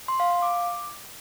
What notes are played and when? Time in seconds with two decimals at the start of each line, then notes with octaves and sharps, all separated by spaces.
0.08 C6
0.20 F5
0.31 F5
0.42 D6